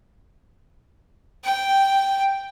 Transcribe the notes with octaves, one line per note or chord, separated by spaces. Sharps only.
G5